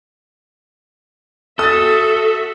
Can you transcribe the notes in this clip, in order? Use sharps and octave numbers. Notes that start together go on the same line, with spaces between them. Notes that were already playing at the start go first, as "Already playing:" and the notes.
F#4 A4 E5 D#6 A6